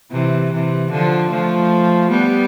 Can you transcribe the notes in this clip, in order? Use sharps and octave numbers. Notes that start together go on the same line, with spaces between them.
C3 E3
C3 E3
D3 F3
F3 A3
G3 B3